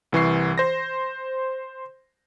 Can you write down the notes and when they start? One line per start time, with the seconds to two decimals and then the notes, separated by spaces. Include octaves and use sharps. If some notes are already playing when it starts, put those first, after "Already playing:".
0.12 C2 E3 C#6 C7
0.58 C5 A#6